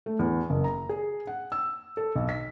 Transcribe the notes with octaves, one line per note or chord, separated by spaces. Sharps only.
A3
E2
F#1
A#5
G#4
F#5
E6
A4
B1
B6